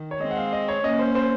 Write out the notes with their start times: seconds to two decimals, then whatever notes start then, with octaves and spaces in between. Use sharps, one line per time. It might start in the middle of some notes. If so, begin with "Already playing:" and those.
Already playing: D#3
0.11 C#5
0.21 G#3 C4 D#5
0.31 F#5
0.37 F5
0.53 D#5
0.68 C#5
0.84 A#3 C#4 D#5
0.99 C5
1.15 C5